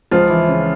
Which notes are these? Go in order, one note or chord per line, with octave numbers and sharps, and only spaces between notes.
C#2 F3 F4
E3
C#3